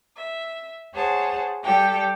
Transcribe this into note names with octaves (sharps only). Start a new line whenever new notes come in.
E5
G#4 C5 C#5 F#5 A5
G3 G4 A4 G5